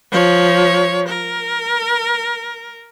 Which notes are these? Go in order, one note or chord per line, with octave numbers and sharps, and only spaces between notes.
F3 C#5
A#4